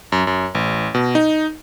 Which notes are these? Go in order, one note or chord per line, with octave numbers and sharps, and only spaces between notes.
F#2
F#2
A1
B2
D#4